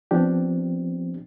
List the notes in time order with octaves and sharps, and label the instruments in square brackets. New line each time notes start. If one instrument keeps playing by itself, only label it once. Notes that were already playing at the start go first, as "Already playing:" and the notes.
[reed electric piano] F3 B3 C4 D4 G4